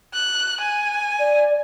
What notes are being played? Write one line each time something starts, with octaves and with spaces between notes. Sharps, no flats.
F#6
G#5
D5